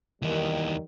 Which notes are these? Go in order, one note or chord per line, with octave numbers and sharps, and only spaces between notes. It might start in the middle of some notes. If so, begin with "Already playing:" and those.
D#2 D#3 E3 G3